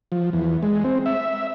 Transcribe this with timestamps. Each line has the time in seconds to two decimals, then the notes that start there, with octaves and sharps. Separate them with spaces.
0.12 F3
0.33 E2
0.63 G#3
0.84 C4
1.06 E5